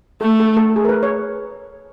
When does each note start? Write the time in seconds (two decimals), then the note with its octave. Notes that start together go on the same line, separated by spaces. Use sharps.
0.21 A3 A4
0.40 A4
0.57 A4
0.76 G#4
0.85 A#4
0.89 B4
1.03 C#5